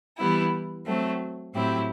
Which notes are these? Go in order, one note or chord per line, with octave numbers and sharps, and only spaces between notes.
E3 G3 B3 E4
F#3 A3 C4
A2 F#3 C4 E4 G4